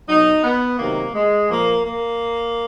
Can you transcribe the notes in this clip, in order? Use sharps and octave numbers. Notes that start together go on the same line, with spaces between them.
B2 F#3 D#4
B3
C3 D#3 F#3 A#3
G#3
A#2 F3 A#3
A#3